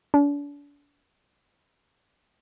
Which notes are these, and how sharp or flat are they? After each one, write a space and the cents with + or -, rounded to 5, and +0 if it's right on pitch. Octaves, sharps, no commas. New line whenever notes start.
D4 -40